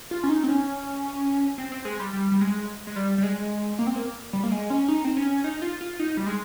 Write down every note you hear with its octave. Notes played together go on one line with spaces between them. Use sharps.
F4
C#4
D#4
C4
C#4
C4
C4
G#3
G3
G3
G3
G#3
G#3
G3
G3
G#3
A#3
C4
A#3
G3
A#3
G#3
C#4
D#4
C4
C#4
D#4
F4
F4
D#4
G3
G#3